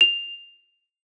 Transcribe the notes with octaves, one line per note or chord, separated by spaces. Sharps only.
F7